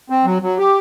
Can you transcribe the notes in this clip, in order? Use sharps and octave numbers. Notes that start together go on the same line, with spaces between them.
C4
F#3
F#3
G4